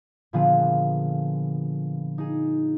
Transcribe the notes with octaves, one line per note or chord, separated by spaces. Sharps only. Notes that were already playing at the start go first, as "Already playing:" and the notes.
A#2 D3 F3 B3 F4 G#4
D#4 G#4